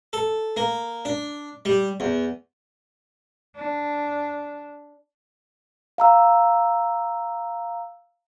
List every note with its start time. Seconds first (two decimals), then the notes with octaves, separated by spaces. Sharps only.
0.13 A4
0.57 A#3
1.05 D4
1.65 G3
2.00 E2
3.56 D4
5.98 F5 A#5 E6